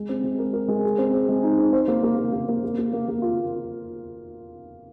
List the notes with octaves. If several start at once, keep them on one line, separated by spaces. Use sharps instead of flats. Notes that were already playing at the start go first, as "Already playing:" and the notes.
Already playing: G#3
C4
G#3
A#4
A#4
G#3
G#4
C4
G#4
G#3
D#4
C4
C5
A#3
A#3
A#3
A#3
A#3
A#3
A#3
A#3
A#3
F4